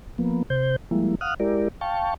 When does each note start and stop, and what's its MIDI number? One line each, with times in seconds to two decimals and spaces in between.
0.18 0.43 53
0.18 0.43 58
0.18 0.43 59
0.50 0.76 48
0.50 0.76 72
0.50 0.76 91
0.91 1.15 53
0.91 1.15 55
0.91 1.15 56
0.91 1.15 58
0.91 1.15 64
1.21 1.34 77
1.21 1.34 78
1.21 1.34 87
1.21 1.34 89
1.21 1.34 90
1.40 1.68 56
1.40 1.68 64
1.40 1.68 67
1.40 1.68 70
1.40 1.68 74
1.81 2.14 77
1.81 2.14 79
1.81 2.14 81
1.81 2.14 85